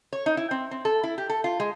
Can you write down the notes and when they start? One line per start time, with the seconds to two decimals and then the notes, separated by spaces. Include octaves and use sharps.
0.13 C#5
0.26 D#4
0.37 E4
0.51 C4
0.71 C4
0.85 A4
1.04 E4
1.18 G4
1.29 A4
1.44 F4
1.60 G#3